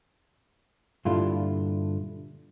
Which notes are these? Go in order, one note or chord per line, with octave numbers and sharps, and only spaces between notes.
G2 A#2 D3 E4 F4